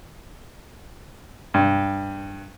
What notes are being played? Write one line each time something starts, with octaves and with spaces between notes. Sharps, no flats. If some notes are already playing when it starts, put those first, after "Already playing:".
G2